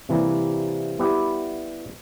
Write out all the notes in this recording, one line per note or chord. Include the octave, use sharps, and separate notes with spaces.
C3 E3 G3 A#3
G3 B3 E4 G4 B4